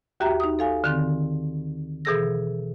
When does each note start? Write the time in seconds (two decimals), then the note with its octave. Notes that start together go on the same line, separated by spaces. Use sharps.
0.20 D#2 F#4 G4 E5 G5 A#5
0.40 D#4 D#6
0.59 A4 F5 G#5
0.84 D3 D#3 C4
2.05 B2 E3 G#4 A4 E6 A#6